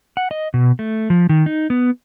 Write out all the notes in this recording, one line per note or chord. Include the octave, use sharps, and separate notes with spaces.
F#5
D#5
B2
A3
F3
D#3
D#4
B3